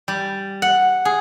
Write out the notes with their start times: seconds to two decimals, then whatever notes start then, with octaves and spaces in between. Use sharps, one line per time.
0.08 G3
0.62 F#5
1.05 G#4